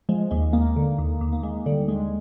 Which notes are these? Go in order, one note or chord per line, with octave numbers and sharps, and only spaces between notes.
F3 G#3
D#2 G#3
D#2 A#3
D3
D#2
D#2
A#3
D#2 G#3
D3 G3
D#2 G#3